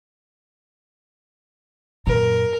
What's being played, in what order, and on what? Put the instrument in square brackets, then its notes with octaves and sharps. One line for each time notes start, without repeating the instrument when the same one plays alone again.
[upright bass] F#2 A#2 [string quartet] A#4